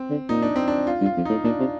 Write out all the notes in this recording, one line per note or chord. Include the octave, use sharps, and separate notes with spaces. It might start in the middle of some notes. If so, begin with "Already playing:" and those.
Already playing: C4
D3
A#2 D#4
D4
C4
D4
F4
G2
F4
F2
A2 D#4
A#2 D4
C3